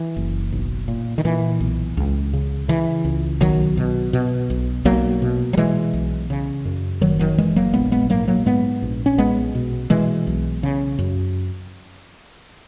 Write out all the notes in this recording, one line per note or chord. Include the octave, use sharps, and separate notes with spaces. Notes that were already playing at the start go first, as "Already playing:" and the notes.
Already playing: E3
F#1
B1
A#2
D#3
A#2 E3
B1
C#2
C#3
C#3 E3
C#2
B1 D#3 F#3
B2
B2
B1
B1 F#3 A#3
B2
F#3
B2 E3 G#3
B1
C#3
F#2
F#1 D#3 F#3
D#3 F#3
F#1 E3 G#3
F#3 A#3
A#1 G#3 B3
G#3 B3
G#2 F#3 A#3
F#3 A#3
G#2 G#3 B3
A#1
C#4
B1 G#3 B3
B2
B2 E3 G#3
B1
C#3
F#2